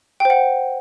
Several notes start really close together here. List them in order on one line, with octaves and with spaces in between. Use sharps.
G5 C5 F#5